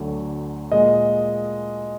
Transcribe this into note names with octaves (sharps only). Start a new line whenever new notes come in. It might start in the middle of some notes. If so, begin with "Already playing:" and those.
Already playing: D2 D3 F#3
A#2 G#3 D#5